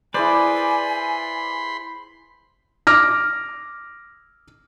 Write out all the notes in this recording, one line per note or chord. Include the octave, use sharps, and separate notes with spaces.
E4 G#4 B4 C5 D5 G#5 B5 C6
D6 F6 A#6